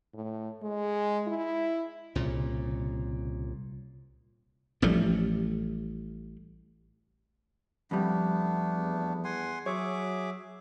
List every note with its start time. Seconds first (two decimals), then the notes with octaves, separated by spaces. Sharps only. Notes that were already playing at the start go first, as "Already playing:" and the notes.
0.14 A2
0.63 G#3
1.28 E4
2.15 C2 A#2 C#3
4.82 A1 F3 G3 A3
7.91 F2 G3 A3 B3 D4
8.77 E2
9.24 F#5 G#5 C6
9.66 F#3 G#4 C#5 E5 D6